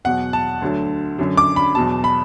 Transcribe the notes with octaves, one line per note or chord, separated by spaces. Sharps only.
E2 B2 F#3 F#5
A5
D2 D3 F#3
F#2 D3 F#3
D6
B5
E2 B2 F#3 A5
B5